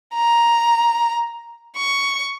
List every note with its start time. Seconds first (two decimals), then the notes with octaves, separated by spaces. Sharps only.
0.15 A#5
1.76 C#6